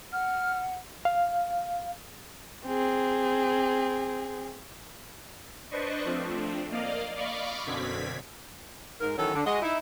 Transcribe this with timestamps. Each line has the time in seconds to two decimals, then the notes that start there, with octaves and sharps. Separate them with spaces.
0.13 F#5 F6
1.05 F5
2.66 C4 G#4
5.71 D4 B4 C5 D5 D#5 C#6
6.05 F3 A3 C4 D4
6.71 A#3 D5 D#5 F5
7.16 D5 D#5 F5 B5 C#6 D6
7.65 F#2 B2 D3 C4 G#6 B6
9.00 G#2 A#4
9.17 D#3 E3 F#3 C#4 F#4 A4
9.35 D3
9.46 G#3 F#4 D#5
9.62 D#4 E4